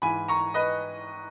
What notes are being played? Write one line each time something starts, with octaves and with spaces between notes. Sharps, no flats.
G#2 E3 G#5 B5
A#5 C#6
B4 D#5